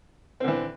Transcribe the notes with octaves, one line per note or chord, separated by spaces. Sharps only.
D3 E3 C4